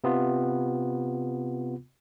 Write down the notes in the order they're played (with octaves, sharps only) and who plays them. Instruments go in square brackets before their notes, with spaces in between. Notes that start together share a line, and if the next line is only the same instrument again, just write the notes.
[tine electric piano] C3 B3 F4